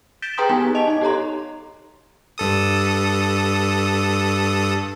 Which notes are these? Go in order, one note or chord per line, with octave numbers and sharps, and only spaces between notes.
G6 A6 B6 D7 E7 G7
G#4 B4 G5 A#5 C6 D#6
B3 D#4 G4 G#5 B6
D#5 A5 F7
D#4 D#5
G4 A4 C#5 A#5 C6
G2 A4 D#6